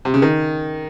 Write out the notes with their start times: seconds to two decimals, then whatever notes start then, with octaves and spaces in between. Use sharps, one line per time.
0.05 C3
0.14 C#3
0.22 D#3